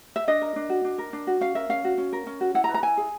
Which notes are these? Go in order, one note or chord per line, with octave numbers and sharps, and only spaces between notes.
E5
D4 D#5
A#4
D4
F#4
D4
A#4
D4
F#4
C#4 F5
A#4 E5
C#4 F5
F#4
C#4
A#4
C#4
F#4
E4 F#5
A#5
B4
A#5
E4 G#5
G#4